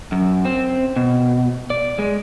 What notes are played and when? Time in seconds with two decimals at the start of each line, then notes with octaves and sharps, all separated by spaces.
0.12 F#2
0.45 C4
0.96 B2
1.70 D5
1.99 G#3